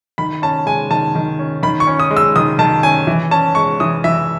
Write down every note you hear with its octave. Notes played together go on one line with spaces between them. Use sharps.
D#3 B5
C#4 A5
G#3 G#5
D#3 A5
D#3
C#4
D#3 B5
C#6
C#4
D#6
G#3
E6
D#3 D#6
D#3 A5
C#4 G#5
E3
C#4 A5
G#3 C#6
E3 D#6
E3 E5